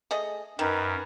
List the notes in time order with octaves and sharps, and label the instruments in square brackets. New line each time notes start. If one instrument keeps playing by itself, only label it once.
[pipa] A3 G#4 D#5
[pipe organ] F#2 [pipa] D#3 [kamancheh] A#4 B4